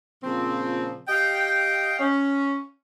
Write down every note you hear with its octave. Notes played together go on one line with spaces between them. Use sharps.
A#2 C#3 F3 C4
G4 D#5 F5 G5
C#4